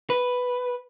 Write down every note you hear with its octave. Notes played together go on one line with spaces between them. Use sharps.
B4